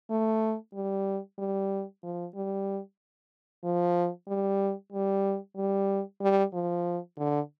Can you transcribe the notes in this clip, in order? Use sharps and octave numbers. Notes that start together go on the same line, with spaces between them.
A3
G3
G3
F3
G3
F3
G3
G3
G3
G3
F3
D3